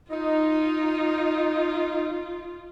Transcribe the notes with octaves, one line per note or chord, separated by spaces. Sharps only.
D#4 F4